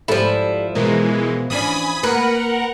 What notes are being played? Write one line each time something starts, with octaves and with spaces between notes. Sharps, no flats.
G#2 F3 G3 E4 A4
B2 E3 G#3 A#4
E3 C#4 D4 G#5 B5 D#6
A#3 A#4 B4 F#5